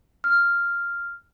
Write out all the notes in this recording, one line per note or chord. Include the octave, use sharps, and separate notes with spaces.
F6